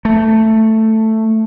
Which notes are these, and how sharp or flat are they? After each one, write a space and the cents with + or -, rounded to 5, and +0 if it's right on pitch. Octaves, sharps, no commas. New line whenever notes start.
A3 +5